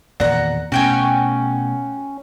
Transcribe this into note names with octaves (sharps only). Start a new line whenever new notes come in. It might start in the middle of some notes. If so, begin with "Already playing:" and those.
E2 A#2 D#3 D5 F#5 A#5
B2 A3 C#4 F#4 G5 G#5